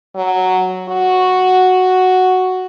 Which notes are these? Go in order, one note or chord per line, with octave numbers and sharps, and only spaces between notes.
F#3
F#4